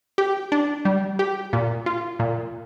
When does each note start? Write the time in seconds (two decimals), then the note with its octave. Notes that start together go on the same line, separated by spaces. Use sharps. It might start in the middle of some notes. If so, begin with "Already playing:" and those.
0.18 G4
0.52 D4
0.85 G3
1.19 G4
1.53 A#2
1.86 F4
2.19 A#2